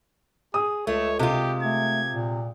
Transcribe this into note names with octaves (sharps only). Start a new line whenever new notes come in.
G#4 D#6
C#2 A3 C#5
C3 G#3 F4 G4
A3 G#6
A#2